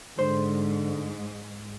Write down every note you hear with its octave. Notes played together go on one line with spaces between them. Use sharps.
G#2 D3 G#3 C5